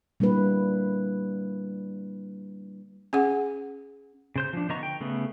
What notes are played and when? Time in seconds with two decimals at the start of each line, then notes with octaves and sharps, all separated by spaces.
0.20 G3 A#3 D4 E4 B4
3.13 C#4 G#4 F#5
4.36 C#3 C5 G6
4.53 F3 D4
4.69 D3 B3 D#5 A#5 C#6
4.83 G5
5.00 C#3 A3 B3